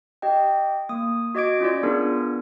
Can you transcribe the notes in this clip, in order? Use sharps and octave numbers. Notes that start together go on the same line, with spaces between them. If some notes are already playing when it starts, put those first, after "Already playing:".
G4 D#5 G5
A#3 D#6
F#4 D#5 D6 G#6 D7
C#4 F4 D5
B3 D4 F4 G#4 A#4